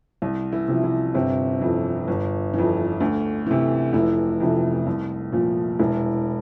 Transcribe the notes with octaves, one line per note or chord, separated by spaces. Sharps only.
C2
E3 E4
C3 F3
E3 E4
G1 C3 C4
F2 E3
G1
F2 E3
D2
C3 E3
F1 E3 E4
F2 C3 E3
C2
A#2 F3
E1 E3 E4